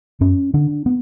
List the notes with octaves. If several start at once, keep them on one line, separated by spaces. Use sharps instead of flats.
F#2 C#4
D3 D4
B3